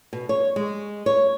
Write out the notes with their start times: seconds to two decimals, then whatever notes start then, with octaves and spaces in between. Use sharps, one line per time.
0.13 B2
0.29 C#5
0.56 G#3
1.06 C#5